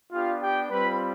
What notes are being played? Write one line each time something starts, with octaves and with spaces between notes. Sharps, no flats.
B3 D4 F4 G4 F5
G4 G5
G3 C4 F4 B4 B5